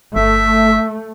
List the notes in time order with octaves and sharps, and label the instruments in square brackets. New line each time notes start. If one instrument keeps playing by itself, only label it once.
[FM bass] G1 [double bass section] A3 [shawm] E5